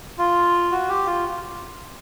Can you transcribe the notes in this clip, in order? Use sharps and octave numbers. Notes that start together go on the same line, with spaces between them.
F4
F#4
G4
F4